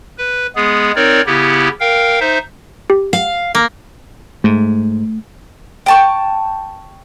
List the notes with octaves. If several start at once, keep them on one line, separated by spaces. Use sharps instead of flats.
B4
G#3 B3 G#4
C4 D#4 A#4 C#5 D5
C#3 B3 E4 G4
A#4 F5 G5
D#4 C5 E5
G4
F5
A#3
G#2 A3
G5 A5 C#6